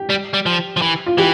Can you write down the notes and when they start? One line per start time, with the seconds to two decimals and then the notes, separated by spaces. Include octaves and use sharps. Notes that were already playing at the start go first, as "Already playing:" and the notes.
Already playing: G4
0.10 G3
0.34 G3
0.46 F3
0.77 F3
0.82 E3
1.06 F4
1.18 E3 G4